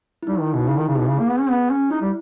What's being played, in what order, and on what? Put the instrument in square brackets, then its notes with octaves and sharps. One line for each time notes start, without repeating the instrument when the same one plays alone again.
[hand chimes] E4
[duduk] G3 [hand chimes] D#4
[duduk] D#3
[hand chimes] E4
[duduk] B2
[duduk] C#3 [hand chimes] D#4
[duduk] D#3 [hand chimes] E4
[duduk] C#3
[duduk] B2 [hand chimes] G#4
[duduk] C#3
A#3
B3
C#4
B3
C#4
[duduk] D#4 [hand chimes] E4
[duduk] G3